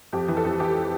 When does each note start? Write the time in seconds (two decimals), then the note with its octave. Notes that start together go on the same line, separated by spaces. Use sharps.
0.13 F2 G4
0.28 E3
0.37 A4
0.45 F2
0.60 E3 G4